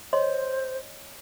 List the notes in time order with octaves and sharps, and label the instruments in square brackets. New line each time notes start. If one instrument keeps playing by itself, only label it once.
[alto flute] C5 [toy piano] C#5 D#5 C6